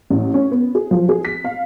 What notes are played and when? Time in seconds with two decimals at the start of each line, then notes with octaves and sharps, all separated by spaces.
0.10 A1
0.34 C#4
0.52 B3
0.75 G#4
0.91 F3
1.09 G#4
1.25 B6
1.44 F5